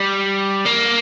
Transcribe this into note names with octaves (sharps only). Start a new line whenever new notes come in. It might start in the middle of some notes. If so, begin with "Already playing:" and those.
Already playing: G3
A#3